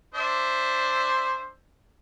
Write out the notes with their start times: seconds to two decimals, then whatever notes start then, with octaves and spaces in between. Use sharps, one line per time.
0.15 D4 C5 E5